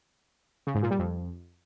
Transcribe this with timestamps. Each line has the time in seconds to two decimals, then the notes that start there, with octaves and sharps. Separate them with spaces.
0.67 C#3
0.75 G#2
0.83 A#2
0.91 G3
0.99 F2